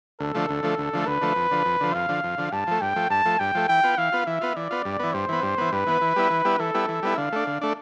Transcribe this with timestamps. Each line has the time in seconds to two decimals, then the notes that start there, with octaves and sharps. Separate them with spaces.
0.20 D2 A4
0.35 D3 F3 A3
0.49 D2
0.63 D3 F3 A3
0.78 D2
0.93 D3 F3 A3
1.07 D2 B4
1.21 D3 F3 A3
1.36 F2
1.51 D3 F3
1.65 F2
1.80 D3 F3
1.94 F2 F5
2.09 D3 F3
2.24 F2
2.38 D3 F3
2.52 G2 A5
2.67 F3 A3
2.81 G2 G5
2.96 F3 A3
3.10 G2 A5
3.25 F3 A3
3.39 G2 G5
3.55 F3 A3
3.68 E3 G5
3.83 B3 F4
3.98 E3 F5
4.12 B3 F4
4.27 E3 E5
4.41 B3 F4
4.56 E3 D5
4.71 B3 F4
4.85 G2
4.99 E3 B3
5.14 G2 C5
5.29 E3 B3
5.43 G2
5.58 E3 B3
5.72 G2 B4
5.87 E3 B3
6.01 E3
6.16 G3 B3 E4
6.30 E3
6.45 G3 B3 E4
6.59 E3 A4
6.74 G3 B3 E4
6.88 E3
7.03 G3 B3 E4
7.17 D3 F5
7.32 A3 D4
7.47 D3
7.61 A3 D4